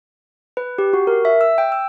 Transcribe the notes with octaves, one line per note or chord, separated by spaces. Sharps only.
B4
G4
F#4
A#4
E5
E6
G5
E6